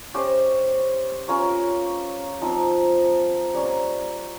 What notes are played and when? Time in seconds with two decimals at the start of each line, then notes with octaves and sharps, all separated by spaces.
0.14 C#4 G4 C5 D#5
1.28 C#4 F4 A#4 C#5
2.41 F3 C4 D#4
3.55 G3 A#3 C#4